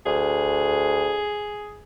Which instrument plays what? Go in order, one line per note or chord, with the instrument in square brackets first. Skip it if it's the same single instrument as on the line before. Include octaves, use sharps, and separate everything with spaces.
[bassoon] D2 [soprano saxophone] G#4